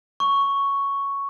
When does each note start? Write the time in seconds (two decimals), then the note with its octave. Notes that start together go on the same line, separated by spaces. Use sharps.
0.20 C#6